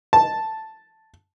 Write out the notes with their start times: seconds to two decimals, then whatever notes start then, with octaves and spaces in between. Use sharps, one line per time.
0.13 A5